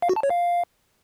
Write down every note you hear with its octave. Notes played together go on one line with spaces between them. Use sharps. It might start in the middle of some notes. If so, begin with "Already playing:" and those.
F5
F#4
A5
C#5
F5